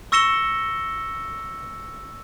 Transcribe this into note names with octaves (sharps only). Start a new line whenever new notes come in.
C#6 E6 A#6 C#7 E7 G7